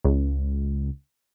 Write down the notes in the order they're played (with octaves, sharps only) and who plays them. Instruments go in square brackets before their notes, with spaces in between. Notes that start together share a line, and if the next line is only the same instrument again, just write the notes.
[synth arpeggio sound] C#2